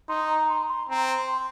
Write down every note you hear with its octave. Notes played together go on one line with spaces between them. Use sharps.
D#4 C6
A#5
C6
A#5
C6
C4 A#5
C6